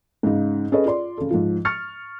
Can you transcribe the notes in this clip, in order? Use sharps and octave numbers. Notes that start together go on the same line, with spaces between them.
G#2 C#3 D#4
C#4 G#4 A4 B4 C#5 D#5
F4 D5 C6
C#3 A4
G#2 F3
C#6 F6 A6 C#7